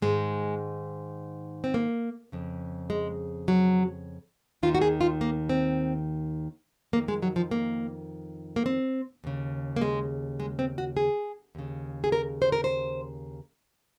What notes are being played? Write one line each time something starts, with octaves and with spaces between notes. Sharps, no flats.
G#2 D#3 G#3
C4
A#3
F2 C#3
G#3
F#3
D#2 D#3 F4
F#4
G#4
F4
A#3
C4
F2 D#3 A#3
G#3
F#3
F3
A#3
A#3
C4
D#2 C#3
A#3
G#3
G#3
C4
F#4
G#4
D#2 C#3
G#4
A#4
C5
A#4
C5